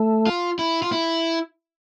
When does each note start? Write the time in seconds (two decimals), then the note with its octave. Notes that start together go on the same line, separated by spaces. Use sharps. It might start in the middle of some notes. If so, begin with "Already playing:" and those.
Already playing: A3
0.27 F4
0.59 E4
0.82 F4
0.92 E4